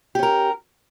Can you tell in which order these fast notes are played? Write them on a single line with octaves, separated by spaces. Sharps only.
G4 C#4 A#4